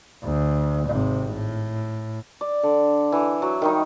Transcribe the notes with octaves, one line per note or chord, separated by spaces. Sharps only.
D2
G#1 C3
A2
D5
D3
E3
F#3
D#3 G3 D#4